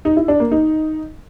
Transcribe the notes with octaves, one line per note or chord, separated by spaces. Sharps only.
D#4
E4
D4
A#3
D#4